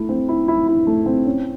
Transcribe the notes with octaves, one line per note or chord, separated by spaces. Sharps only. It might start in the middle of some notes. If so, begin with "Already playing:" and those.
Already playing: A3 E4
C4
E4
E4
E4
A3
C4
C#4